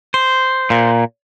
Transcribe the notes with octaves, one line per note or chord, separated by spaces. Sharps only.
C5
A#2